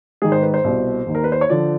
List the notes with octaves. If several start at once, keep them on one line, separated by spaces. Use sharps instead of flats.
G#2 D#3 G#4
C5
B4
C5
C2 B2
D#2 D#3
A#4
B4
C5
C#5
D3 F3 D5